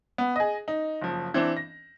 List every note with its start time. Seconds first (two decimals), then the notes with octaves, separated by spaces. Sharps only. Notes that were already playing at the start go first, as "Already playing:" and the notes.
0.18 B3
0.36 G#4 D#5
0.68 D#4
1.02 F#1 F3
1.34 E3 C4 D4
1.57 A#6